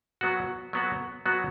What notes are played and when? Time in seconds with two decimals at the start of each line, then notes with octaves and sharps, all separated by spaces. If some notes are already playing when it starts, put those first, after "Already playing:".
0.21 F#3 B3 F#4
0.73 F#3 B3 F#4
1.26 F#3 B3 F#4